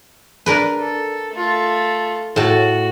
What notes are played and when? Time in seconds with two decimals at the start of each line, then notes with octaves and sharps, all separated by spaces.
0.46 D4 A#4 B4
0.79 A4
1.32 A3 F4
2.36 A2 F#4 A5